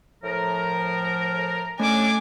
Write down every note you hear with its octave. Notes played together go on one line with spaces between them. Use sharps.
A2 F3 A#4
A3 C#4 D4 G#5 D6